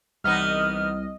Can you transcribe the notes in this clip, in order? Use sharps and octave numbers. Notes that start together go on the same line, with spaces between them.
C2 E3 B3 D#4 D#5 F6